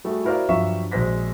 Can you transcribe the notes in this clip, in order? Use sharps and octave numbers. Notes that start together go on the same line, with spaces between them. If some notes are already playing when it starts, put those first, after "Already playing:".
G3 A3 F#4 G#4
E4 F#4 A#4 C5 D5 F5
G2 F3 F#3 E5 F5 C#6
A#1 G#3 F#4 C5 A#6 B6